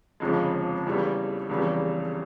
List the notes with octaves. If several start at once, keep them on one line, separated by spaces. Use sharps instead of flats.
G1 F2 C#3 F3 G#3
E2 C#3 E3 G3
F1 E2 C#3 E3 G3